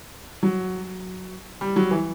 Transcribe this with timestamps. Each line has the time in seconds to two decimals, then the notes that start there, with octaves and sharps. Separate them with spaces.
0.43 F#3
1.61 G3
1.76 F#3
1.91 E3